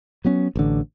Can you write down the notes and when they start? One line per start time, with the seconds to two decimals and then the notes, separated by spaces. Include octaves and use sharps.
0.25 F#3 B3 C#4
0.56 A1 D3